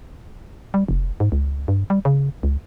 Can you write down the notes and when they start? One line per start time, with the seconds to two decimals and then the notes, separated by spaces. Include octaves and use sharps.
0.74 G3
0.88 F1
1.20 G#2
1.32 C#2
1.68 G2
1.90 G3
2.05 C#3
2.43 C#2